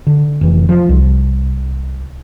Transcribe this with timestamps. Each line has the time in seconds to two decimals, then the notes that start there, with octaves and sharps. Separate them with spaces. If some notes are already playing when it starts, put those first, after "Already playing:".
0.07 D3
0.41 F1 E3
0.69 F3
0.89 C2